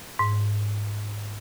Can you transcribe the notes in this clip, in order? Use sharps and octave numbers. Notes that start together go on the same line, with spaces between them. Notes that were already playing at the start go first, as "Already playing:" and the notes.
G#2